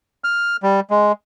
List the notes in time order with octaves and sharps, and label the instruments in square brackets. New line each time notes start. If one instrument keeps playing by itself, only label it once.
[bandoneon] F6
G3
G#3